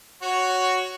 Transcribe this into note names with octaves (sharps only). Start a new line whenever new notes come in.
F#4 C#5